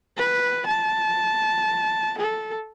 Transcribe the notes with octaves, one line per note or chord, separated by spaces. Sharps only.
B4
A5
A4